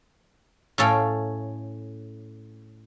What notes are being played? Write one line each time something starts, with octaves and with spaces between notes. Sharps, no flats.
A2 C#4 A4 F5 G5